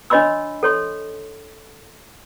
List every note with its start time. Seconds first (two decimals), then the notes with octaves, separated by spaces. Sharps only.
0.10 D4 C#5 D#5 B5 C6 E6
0.63 A4 C#5 C6